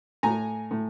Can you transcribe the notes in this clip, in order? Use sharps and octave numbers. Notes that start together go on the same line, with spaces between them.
A2 G#5 A#5
A2